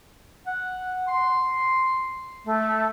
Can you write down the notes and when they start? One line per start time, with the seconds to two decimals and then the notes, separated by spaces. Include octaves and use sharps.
0.47 F#5
1.08 C6
2.45 A3